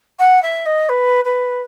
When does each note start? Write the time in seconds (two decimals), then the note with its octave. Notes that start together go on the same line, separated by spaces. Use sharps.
0.19 F#5
0.42 E5
0.65 D#5
0.89 B4
1.24 B4